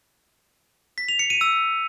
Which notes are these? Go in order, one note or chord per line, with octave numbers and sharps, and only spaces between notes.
B6
F7
C#7
D#7
E6